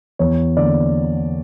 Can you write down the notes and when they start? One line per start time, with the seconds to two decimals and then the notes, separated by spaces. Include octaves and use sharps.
0.19 E2 C#5
0.57 D3 A#3 D5